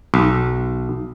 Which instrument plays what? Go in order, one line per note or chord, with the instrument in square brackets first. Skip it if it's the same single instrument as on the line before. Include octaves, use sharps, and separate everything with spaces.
[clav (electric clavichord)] B1